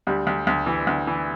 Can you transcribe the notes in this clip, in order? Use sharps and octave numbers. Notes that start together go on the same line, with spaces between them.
D2 G3
D2
D2
E3
D2
E3